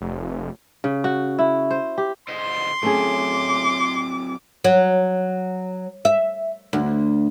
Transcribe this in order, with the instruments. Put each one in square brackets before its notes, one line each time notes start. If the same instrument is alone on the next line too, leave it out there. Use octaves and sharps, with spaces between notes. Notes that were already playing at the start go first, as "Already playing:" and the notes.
[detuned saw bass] F1
[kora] C#3
F#4
E4
C5
G4
[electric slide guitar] D3 C5 D#5 [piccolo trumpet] C6
[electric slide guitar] F#3 C4 [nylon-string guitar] A3 C#4 G#4 [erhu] D6
[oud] F#3
E5
D2